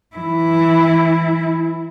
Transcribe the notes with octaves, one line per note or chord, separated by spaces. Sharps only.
E3 E4